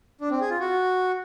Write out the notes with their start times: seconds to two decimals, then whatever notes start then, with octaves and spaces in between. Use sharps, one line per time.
0.21 D4
0.31 C4
0.40 G#4
0.50 F4
0.60 F#4